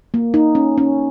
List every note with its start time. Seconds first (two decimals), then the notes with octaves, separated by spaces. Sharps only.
0.14 A#3
0.34 D#4
0.55 C#4
0.78 C#4